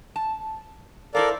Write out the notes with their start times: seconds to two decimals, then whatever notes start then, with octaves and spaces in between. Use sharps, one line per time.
0.16 A5
1.15 E4 A4 A#4 C5 D5 F5